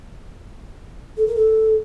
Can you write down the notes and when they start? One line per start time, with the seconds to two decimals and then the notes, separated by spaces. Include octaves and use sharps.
1.17 A4
1.26 A#4
1.36 A4